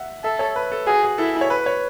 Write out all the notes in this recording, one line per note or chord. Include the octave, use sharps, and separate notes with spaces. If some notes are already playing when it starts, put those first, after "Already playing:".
Already playing: E5 F#5
A4 E5
C#5
B4
A4
F#4 G#4
G#4
E4 A4
C#5
B4
C#5